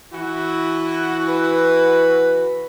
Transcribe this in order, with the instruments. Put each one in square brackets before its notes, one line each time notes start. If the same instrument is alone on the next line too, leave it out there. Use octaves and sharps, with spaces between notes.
[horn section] E3 E4 F#4
[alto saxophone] B4